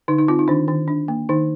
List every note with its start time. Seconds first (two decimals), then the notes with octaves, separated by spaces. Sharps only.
0.08 D3 D#4
0.18 D#4
0.28 C4 F4
0.39 D#4
0.48 D#3 D4
0.68 D#3
0.88 D4
1.08 A#3
1.29 D#3 D#4